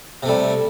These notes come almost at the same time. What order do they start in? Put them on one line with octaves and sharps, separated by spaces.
C3 A3 G3